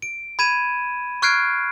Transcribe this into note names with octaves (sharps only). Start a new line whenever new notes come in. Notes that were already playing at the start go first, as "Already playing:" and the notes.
D7
B5 G#6 D#7 E7
C#6 F6 F#6 G#6 C7 D7